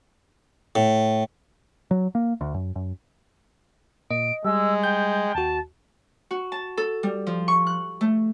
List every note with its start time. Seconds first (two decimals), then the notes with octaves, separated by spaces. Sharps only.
0.76 A2
1.91 F#3
2.15 A#3
2.41 D2
2.54 F#2
2.76 F#2
4.11 A#2 D#5 D7
4.45 G3 G#3 E6
4.83 G5 G6
5.35 D#2 F#4 A5
6.31 F#4
6.52 A5
6.77 A4
7.03 G3
7.27 F3
7.48 C#6
7.67 F#6
8.01 A3